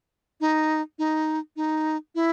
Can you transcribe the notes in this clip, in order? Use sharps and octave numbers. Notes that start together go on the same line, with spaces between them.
D#4
D#4
D#4
E4